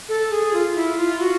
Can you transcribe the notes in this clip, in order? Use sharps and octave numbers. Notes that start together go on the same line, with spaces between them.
A4
G#4
F4
E4
F4
F#4